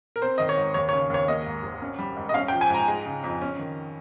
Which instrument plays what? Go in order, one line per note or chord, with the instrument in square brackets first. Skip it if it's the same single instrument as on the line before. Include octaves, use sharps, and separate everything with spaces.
[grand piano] A#4
C4 C5
D#3 D#5
C#5
G#2
D#2 C#5
C#5
C#3
D#2 C#5
A#3 D#5
G#2
G#1
C#4
G3
G#2
D#5
C#4 F5
G5
F3
G#5
G#2 A#5
G#3
C#3
F2
C#4
D#3